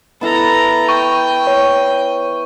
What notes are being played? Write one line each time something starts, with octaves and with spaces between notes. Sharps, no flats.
B3 E4 A4 A#5
G5 C#6
C#5